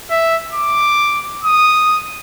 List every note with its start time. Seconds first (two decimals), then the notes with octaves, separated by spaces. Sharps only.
0.11 E5
0.53 D6
1.44 D#6